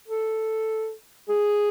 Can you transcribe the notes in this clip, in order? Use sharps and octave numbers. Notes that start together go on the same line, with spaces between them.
A4
G#4